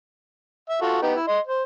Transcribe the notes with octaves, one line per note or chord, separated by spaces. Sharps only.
E5
F4 F#4 A4
B3 D#4 G4
E4
D#5 C6
C5